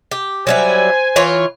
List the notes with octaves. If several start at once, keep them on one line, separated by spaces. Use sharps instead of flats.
G4
F#3 G3 E4 C5 G#5
E3 F4 C#5